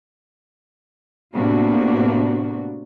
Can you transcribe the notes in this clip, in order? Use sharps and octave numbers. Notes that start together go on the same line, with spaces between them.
A2 C3 A#3 B3 D4 F#4